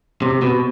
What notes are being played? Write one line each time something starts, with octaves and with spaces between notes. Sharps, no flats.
C3
B2